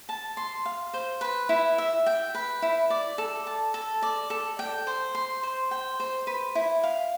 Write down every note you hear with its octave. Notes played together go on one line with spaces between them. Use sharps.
A5
C6
F5
C5
B4
E4
E5
G5
B4
E4
D5
A4
A5
A4
D5
A4
G5
C5
C6
C5
G5
C5
B4
E4
F5